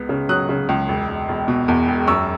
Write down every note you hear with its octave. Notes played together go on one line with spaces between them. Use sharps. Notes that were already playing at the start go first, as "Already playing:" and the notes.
Already playing: C#2 B3
C#3
F#3 D#6 F#6
C#3
C#2
E1
E1
E1
B2
E2
E1
F#2 C#6 E6